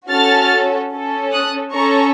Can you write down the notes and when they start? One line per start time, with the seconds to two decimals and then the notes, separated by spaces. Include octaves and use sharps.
0.10 C#4 F#4 A4 F6 A6
0.93 C#4 A4
1.33 D#6 F#6
1.74 C#4 A4 A#5 C#6